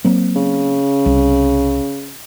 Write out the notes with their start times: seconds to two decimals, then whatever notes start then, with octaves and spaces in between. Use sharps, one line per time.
0.05 F#3 A#3 C4
0.36 C#3
1.06 C2